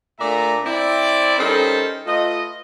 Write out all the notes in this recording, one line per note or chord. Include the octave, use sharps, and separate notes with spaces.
A#2 A3 D4 D5 E5 A#5
C4 E4 D5
G3 C#4 D#4 A4 A#4 C5
A3 F4 B4 D#5